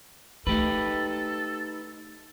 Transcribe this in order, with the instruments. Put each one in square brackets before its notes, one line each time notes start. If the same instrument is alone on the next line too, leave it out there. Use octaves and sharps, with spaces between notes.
[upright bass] A3 [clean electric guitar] D#4 G4 B4 [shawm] A4